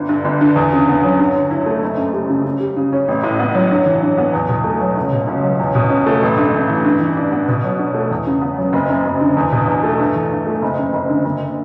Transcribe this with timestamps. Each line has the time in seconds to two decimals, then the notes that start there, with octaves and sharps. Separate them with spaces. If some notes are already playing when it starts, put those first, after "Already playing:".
Already playing: G1 D3
0.09 G2
0.25 G1
0.41 D3
0.56 E2
0.73 C#3
0.88 B3
1.03 F#3
1.19 G2
1.35 D3
1.51 E4
1.66 A3
1.82 F#1
1.97 F#2
2.13 G3
2.29 C#3
2.45 C#3
2.60 G3
2.76 C#3
2.93 C#4
3.08 A1
3.23 A2
3.39 B3
3.55 F#3
3.71 G2
3.86 E3
4.02 G2
4.17 B3
4.33 E2
4.49 B2
4.64 A3
4.81 F#3
4.97 C#2
5.12 B2
5.28 C#2
5.43 F#3
5.59 E2
5.75 B2
5.90 C#4
6.06 A3
6.22 A1
6.37 G2
6.54 A1
6.70 E3
6.85 G2
7.01 E3
7.17 D4
7.32 B3
7.48 B2
7.64 F#3
7.79 D4
7.94 A3
8.11 E2
8.26 C#3
8.41 B3
8.58 F#3
8.73 F#1
8.89 F#2
9.05 F#1
9.21 D3
9.37 E2
9.52 B2
9.68 E2
9.84 A3
9.99 G2
10.15 E3
10.31 G2
10.47 A3
10.62 F#1
10.78 F#2
10.93 F#1
11.09 D3
11.25 F#1